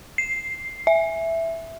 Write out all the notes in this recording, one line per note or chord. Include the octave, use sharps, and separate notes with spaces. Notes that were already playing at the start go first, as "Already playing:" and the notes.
C7
E5